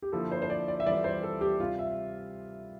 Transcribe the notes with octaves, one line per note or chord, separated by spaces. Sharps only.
G4
D3 F3 A#3 E4 A4
C5
C5
D5
D5
E5
E3 G3 C4 F4 A4 D5
C5
A4
G4
C3 G3 C4 F4 G4
E5